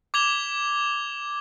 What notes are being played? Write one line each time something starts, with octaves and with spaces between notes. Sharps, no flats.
D6 G#6 F7 G7